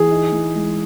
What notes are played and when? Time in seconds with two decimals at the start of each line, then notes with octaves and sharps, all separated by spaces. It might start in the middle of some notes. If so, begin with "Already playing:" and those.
Already playing: E3 G#4
0.11 D#4
0.32 E3
0.55 G#3